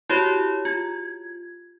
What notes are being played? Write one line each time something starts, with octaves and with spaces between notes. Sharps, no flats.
E4 F#4 G4 C#5
F4 G#6